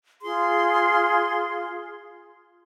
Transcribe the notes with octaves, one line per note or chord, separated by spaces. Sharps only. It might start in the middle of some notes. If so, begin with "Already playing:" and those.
F4 G#4 C6